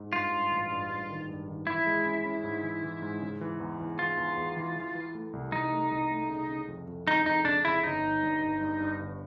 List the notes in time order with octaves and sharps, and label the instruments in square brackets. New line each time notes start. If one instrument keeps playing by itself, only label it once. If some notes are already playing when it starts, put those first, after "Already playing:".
Already playing: [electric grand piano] G#2
[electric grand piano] G2 [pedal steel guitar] F4
[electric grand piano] G2
A1
G2
G2
D#3
G2
D#3
[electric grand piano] E3 [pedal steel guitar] E4
[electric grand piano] G#3
C#4
C#4
G#2
E3
E3
G#2
C#3
E3
E2
E2
[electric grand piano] E3 [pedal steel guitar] F4
[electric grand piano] E2
E2
E3
E3
E3
A3
C2
[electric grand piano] C2 [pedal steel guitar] D#4
[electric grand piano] A3
C2
A3
C#3
C#3
F2
F2
[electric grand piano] F2 [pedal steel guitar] D#4
[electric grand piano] F2 [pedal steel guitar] D#4
[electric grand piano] C#3 [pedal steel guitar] D4
[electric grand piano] C#3 [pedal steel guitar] E4
[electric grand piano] G1 [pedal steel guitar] D#4
[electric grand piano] G1
G2
G1
G2
G2
G1